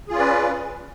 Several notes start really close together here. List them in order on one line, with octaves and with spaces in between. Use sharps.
G#4 F4 C#4 D5 B4